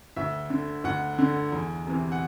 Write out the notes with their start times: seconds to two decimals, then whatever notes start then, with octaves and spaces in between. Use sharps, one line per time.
0.16 D2 E5
0.50 D3
0.84 D2 F#5
1.18 D3
1.52 E2
1.87 C3 E3
2.12 F#5